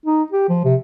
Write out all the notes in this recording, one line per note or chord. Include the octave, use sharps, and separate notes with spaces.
D#4
G4
F3
C3